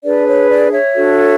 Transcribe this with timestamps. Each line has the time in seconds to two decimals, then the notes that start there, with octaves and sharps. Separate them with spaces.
0.04 D4 G#4 B4 D5
0.26 C#5
0.49 D5
0.72 C#5 E5
0.95 D4 F#4 A4